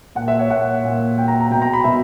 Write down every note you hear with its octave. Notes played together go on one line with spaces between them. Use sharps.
A#2 F#5
E5
C#5
A#2 F#5
A#2
A#2 G5
A#5
A#5
B2 G5
A#5
B5
B2 E5